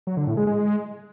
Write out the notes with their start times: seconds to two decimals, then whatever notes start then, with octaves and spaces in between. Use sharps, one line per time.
0.07 F#3
0.17 D3
0.27 A2
0.37 G#3
0.47 G#3